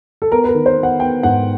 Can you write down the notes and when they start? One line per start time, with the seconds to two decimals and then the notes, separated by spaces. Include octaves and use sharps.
0.22 A4
0.32 B3 A#4
0.44 B4
0.49 A#4
0.55 D#3
0.66 C5
0.78 B3
0.83 F#5
1.00 B3 G5
1.23 G#2 F#5